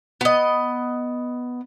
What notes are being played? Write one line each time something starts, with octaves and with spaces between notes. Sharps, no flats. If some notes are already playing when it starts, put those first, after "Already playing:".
B3 D#5